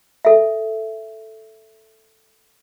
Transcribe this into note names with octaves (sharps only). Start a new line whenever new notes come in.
A4 E5